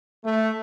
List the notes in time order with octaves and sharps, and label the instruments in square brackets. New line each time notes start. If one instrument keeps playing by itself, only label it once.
[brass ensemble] A3